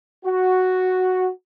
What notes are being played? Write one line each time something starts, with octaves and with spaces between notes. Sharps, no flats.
F#4